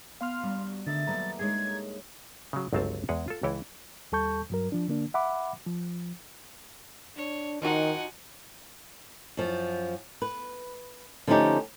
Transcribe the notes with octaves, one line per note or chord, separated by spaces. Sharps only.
B3 F5 C6 F6
G2 G3 A#5
F#4
A2 D3 D#3 E5 A6
A#2 F#3 G3 B3 A4 A#5
G#3 D4 D#4 G#4 C#5 G#6
C#3 F#3
G1 C#2 F#3 C4 F5 A5
E2 G#3 G#4 F#5
F4 A4
C#2 E3 E4 C#5 G5
D#2 G3 A4 A5 C#6 G6
G2 F#3 A#4
F3 D4
D3 A#3 D4
E5 F#5 B5 D6
F3
D4 C#5
D#3 F3 D#4 F#4 F#5 G#5
F#2 F3
B4
D3 F3 A3 C#4 D#4 G4